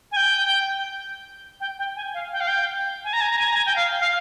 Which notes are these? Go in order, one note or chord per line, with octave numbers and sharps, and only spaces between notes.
G#5
G5
G5
G5
G#5
F5
G5
F5
G5
G#5
A#5
G#5
A#5
G#5
A#5
G#5
G5
F5
F5